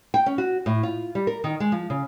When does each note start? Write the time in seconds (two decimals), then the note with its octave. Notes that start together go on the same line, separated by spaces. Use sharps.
0.14 G5
0.26 C#4
0.38 F#4
0.66 A2
0.83 F4
1.15 G3
1.27 A#4
1.44 D#3
1.60 G#3
1.72 F3
1.90 C#3